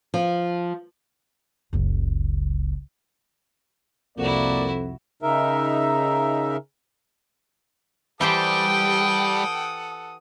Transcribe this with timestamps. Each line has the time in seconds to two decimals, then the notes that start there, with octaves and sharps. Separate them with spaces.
0.14 F3
1.73 F#1 C#2
4.18 C2 F2 A#3 E4 F#4 D5
5.22 C#3 D#4 A#4 E5
8.21 E3 G3 G4 A4 C5 F#5 G5 D#6